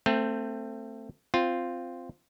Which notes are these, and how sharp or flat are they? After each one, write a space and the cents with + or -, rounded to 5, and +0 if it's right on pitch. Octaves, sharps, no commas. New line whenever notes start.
A3 +20 C4 +0
C4 -5 F4 +0